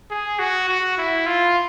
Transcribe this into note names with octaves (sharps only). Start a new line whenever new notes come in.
G#4
F#4
F#4
E4
F4